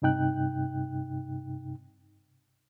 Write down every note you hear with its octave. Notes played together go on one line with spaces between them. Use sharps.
G2 C3 D#4 G5 F#6